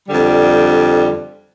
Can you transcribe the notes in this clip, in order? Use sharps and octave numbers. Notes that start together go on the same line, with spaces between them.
F2 D3 G3